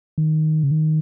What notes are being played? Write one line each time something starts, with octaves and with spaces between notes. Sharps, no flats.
D#3
C#3
D#3